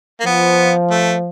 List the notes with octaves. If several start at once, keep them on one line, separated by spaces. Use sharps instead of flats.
A#3
F3 B3
A3